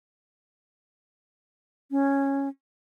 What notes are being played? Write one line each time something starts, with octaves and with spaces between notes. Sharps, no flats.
C#4